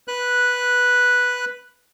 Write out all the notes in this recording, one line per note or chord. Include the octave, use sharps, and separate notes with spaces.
B4 F#6